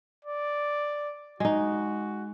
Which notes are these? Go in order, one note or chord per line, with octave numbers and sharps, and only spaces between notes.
D5
G#3 D#4 F#4